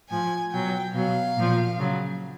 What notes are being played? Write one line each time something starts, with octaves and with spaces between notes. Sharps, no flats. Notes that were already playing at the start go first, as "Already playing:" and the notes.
A2 F3 G#5
B2 F#3 G5
B2 F#3 F5
A#2 F3
C#3 F#3